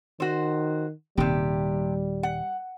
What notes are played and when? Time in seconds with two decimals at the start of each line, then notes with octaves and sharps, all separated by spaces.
0.20 D#3 F#4 C5
1.17 D#1 D#2 C3 G3 G4
2.23 F#5